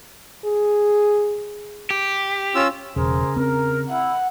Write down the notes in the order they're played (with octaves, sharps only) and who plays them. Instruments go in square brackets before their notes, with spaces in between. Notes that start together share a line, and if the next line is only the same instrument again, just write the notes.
[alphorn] G#4
[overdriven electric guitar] G4
[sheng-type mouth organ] C#4 F4 E6
[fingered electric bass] E1 [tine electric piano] C#3 [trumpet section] G#4 A#4 C5
[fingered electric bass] C4 [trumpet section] A#4
[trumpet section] E4 [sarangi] F#5